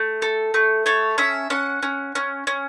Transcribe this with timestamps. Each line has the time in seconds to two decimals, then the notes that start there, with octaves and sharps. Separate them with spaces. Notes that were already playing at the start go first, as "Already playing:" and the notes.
Already playing: A3
0.22 A4
0.54 A3
0.86 A4 C#5
1.18 C#4 E5
1.50 C#4 F#5
1.82 C#4
2.15 C#4
2.47 C#4